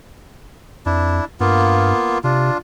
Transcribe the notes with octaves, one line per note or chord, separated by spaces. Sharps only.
F2 D4 E4
G2 A#3 B3 F4
C3 D4 F4